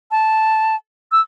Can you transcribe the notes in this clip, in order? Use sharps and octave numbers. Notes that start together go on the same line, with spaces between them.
A5
E6